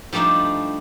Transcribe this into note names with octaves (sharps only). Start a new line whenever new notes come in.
F3 G3 A3 D4 D#4